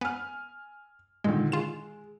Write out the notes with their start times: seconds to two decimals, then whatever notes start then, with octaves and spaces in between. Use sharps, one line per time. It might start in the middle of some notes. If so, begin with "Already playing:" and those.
0.01 B3 G#5 F6
1.24 A#2 D3 D#3 G#3
1.52 G#3 F4 E7